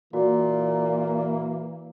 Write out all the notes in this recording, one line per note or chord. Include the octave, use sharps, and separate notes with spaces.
A#2 E3 A#3 F#4